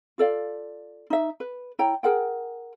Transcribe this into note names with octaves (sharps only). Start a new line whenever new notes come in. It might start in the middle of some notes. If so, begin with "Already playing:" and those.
F4 A4 D5 F5
D#4 E5
B4
E4 C#5 G5 A#5
G#4 A#4 F#5 G5